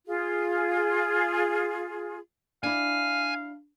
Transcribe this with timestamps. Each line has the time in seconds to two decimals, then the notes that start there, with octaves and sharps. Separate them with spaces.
0.06 F4 G#4
2.63 D4 E4 F5 G#5